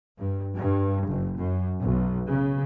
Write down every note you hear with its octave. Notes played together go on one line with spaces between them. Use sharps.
G2
G2
F#1
F#2
B1
C#3